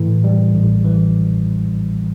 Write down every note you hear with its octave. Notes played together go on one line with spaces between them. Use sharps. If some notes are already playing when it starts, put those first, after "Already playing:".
Already playing: A2 E3
G3
A1
E3